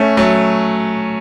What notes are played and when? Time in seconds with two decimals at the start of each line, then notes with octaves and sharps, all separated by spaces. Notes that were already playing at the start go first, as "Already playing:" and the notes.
Already playing: A3 C#4
0.17 F#3 A3